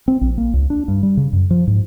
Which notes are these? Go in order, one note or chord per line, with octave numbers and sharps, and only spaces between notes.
C4
A#1
A#3
C#2
D4
G2
G3
C#3
F#2
F3
G#2